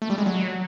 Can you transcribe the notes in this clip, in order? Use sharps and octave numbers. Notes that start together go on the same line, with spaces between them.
A3
G3
G#3
F#3